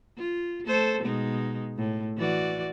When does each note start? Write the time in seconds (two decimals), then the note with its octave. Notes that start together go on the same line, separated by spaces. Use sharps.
0.17 F4
0.67 A3 A4 C5
1.02 B2 G#3 D#4
1.78 A2
2.17 E3 F#4 D5